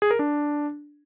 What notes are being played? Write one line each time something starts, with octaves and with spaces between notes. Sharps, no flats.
G#4
A#4
D4